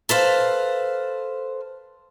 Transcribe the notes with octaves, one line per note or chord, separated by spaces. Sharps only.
A4 B4 C5 F5